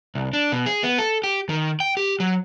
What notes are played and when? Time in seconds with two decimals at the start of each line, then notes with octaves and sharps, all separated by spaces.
0.15 C2
0.33 D4
0.52 B2
0.66 G#4
0.83 B3
0.98 A4
1.24 G4
1.49 D#3
1.80 G5
1.97 G4
2.20 F#3